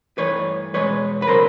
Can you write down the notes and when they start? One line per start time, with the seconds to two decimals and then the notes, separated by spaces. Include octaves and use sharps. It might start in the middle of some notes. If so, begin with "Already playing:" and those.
0.18 G2 E3 A3 B4 C#5
0.73 E2 B2 G#3 B4 C#5
1.22 B4
1.27 C#3 F#3 A3 A#4 C5